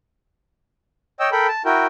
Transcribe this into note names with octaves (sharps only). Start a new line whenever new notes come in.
C#5 D#5 G5 E6
A4 A#4 G5 B5
A5
E4 F#4 A#4 G5